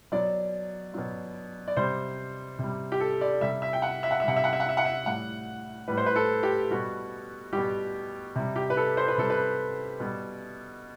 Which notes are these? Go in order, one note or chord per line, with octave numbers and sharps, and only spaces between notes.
B2 F#3 D5
B2 F#3
D5
C3 G3 C5
C3 G3
G4
A4
D5
C3 G3 E5
E5
G5
F#5
E5
F#5
E5
C3 G3 F#5
E5
F#5
E5
F#5
E5
F#5
E5
A2 G3 F#5
A2 G3 B4
C5
B4
A4
G4
B2 G3 F#4
B2 G3 G4
C3 G3
G4
B4
A4
C5
B4
C3 G3 A4
B4
B2 G3